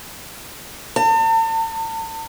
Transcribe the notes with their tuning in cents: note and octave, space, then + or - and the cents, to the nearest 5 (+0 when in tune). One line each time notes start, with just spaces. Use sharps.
A5 +40